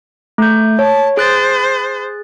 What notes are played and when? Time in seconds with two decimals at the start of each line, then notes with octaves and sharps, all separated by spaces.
0.38 A3 G6
0.79 C#5 A5
1.17 G#4 C5 F#6 A6